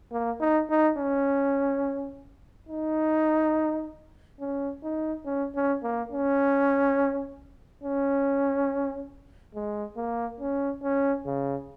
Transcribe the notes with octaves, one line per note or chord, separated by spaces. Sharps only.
A#3
D#4
D#4
C#4
D#4
C#4
D#4
C#4
C#4
A#3
C#4
C#4
G#3
A#3
C#4
C#4
C#3